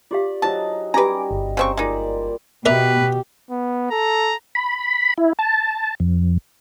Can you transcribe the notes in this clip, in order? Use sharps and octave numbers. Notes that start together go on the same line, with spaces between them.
F4 G4 D5 F5
F#3 D#4 F4 G#4 C5 A5
G3 C#4 G4 B4 G#5 A#5 D6
G1
C#3 C4 C5 A#5 C#6
A#2 G#3 D#4 D5
B2 G4 A#4 B4 D5 E5
B3
A4 A#5
B5
E4
A5
F2